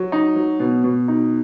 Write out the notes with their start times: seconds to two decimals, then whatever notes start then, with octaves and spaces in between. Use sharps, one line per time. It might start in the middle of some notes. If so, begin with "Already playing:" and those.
Already playing: F#3
0.12 D#4
0.36 F#3
0.60 B2
0.84 B2
1.08 D#4